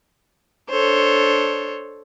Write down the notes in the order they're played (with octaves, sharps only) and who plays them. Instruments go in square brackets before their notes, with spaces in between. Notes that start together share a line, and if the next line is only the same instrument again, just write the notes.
[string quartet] D4 A4 C5 C#5